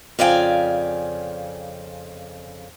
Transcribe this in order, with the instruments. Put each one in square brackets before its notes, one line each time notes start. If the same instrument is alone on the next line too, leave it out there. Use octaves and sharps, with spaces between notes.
[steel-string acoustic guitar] F2 C#3 D5 F5 G5 G#5